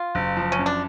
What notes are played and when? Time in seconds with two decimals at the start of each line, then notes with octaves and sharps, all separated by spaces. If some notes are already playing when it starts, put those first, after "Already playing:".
Already playing: F4
0.15 F#1
0.37 F3
0.52 C#4
0.59 F#2
0.66 D4